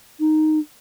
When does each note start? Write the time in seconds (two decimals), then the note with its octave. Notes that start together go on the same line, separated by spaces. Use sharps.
0.20 D#4